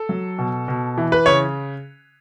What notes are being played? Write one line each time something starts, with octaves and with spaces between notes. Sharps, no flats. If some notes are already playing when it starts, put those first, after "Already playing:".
Already playing: A4
F#3
B2
B2
E3
B4
C#3 C#5